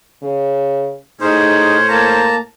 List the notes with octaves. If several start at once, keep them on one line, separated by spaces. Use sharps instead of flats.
C#3
A2 C#4 D#4 G#4 C5
A#3 A5 A#5